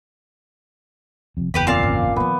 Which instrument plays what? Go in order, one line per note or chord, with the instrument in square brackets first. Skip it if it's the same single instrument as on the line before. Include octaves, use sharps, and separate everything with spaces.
[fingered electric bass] F1 F2
[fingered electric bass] F#1 E2 [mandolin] G4 B4 B5
[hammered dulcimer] A#2 D6 [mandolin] C4 F5 A5
[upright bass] G#1 C#4
[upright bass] D#3 F3 [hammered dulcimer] B3